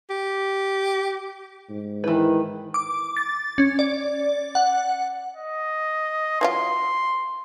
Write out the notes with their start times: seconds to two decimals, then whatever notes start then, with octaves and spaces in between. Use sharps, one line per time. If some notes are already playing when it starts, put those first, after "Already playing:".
0.10 G4
1.70 G#2
2.04 D#3 E3 E4 B4
2.74 D6
3.17 A6
3.58 C#4
3.79 D5
4.55 F#5
5.37 D#5
6.41 E3 F#3 F4 C6